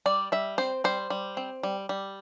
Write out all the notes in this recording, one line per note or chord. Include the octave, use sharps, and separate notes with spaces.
G3 D5
G3 E5
C4 C5
G3 C5
G3
C4
G3
G3